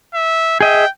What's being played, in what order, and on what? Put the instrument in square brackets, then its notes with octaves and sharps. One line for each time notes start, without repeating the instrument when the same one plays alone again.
[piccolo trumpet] E5
[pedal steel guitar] G#4 D#5 E5 [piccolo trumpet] G5